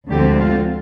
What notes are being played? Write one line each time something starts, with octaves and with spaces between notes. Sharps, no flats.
D2 D3 F3 G#3 C4 G4
F4